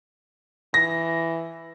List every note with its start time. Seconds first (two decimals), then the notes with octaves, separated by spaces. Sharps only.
0.74 E3 A#6